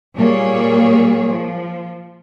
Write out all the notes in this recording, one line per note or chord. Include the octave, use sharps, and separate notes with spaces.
A#2 G3 A#3 G#4 C#5
F3